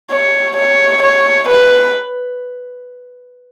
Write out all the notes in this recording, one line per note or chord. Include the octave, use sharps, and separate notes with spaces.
C#5
C#5
C#5
B4